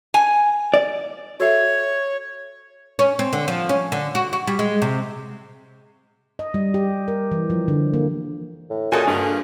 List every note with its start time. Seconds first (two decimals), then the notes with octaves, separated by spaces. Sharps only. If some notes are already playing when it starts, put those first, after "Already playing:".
0.14 G#5
0.74 D5
1.40 F#4 A4 C#5 E5
2.99 C#4
3.19 C4
3.33 D3
3.48 F3
3.69 C#4
3.92 D3
4.15 F#4
4.33 F#4
4.47 G3
4.59 G#3
4.82 C3
6.39 D#5
6.54 G3
6.74 G4
7.08 A#4
7.31 E3
7.50 F3
7.68 D3
7.94 A#3
8.70 A2
8.92 A#2 C#3 F#4 A4 D#5 G#5
9.07 G2 A#3 F4 G#4